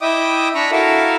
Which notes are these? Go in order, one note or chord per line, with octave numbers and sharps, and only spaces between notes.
E4 D#5 E5 G5 D6 D#6
D4 A#5 B5 C#6
E4 F#4 A4 A#4 E5 F5